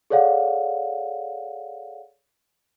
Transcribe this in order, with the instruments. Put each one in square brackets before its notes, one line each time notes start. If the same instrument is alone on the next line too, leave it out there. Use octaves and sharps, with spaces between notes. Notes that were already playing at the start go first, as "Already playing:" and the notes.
[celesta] G#4 A4 C#5 D5 F5 F#5